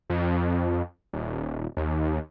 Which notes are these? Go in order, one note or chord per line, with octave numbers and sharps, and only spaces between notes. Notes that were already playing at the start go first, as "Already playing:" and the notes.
F2
D#1
D#2